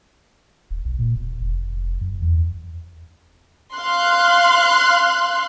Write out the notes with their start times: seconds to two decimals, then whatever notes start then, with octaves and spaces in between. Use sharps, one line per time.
0.70 D#1
0.85 B1
0.99 A#2
1.15 D#1
1.41 F1
2.01 F#2
2.22 E2
3.76 F5 C6 F#6